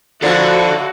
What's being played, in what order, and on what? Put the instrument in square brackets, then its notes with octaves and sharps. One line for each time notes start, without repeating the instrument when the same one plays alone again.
[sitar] A2 D3 A#3 [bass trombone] F3 [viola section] F#4 [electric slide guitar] A4 D5